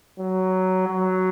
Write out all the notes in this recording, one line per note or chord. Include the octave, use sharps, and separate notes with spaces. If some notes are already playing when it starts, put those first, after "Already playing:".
F#3
F#3